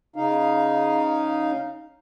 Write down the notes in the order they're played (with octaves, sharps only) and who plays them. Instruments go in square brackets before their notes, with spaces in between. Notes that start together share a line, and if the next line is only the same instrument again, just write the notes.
[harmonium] C#3 D#4 F5